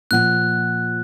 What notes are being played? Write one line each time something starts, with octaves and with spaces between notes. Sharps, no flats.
A#2 F3 F#5 F#6